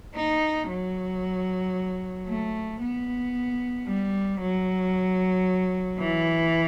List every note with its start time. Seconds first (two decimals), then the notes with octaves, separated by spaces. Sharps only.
0.15 D#4
0.68 F#3
2.27 A3
2.80 B3
3.87 G3
4.40 F#3
5.99 E3